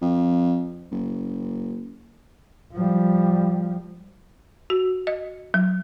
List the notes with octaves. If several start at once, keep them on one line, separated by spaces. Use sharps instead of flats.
F2
F#1
F3 G3
F#4
D#5
F#3